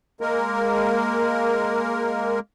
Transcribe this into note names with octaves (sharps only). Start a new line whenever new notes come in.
G#3 A#3 A#4